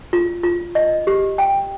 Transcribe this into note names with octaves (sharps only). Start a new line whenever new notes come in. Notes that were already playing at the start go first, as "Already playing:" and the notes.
F4
F4
D#5
G4
G5